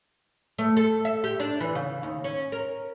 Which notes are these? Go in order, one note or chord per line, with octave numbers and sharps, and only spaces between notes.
A3
A4
E5
G4
D4
E3
C#3
D#2
C#4
A#4